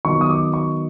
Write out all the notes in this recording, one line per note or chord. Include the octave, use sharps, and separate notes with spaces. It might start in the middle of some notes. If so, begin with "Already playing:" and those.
D#3 F#3 B3 C#6
D#6
D6
C#6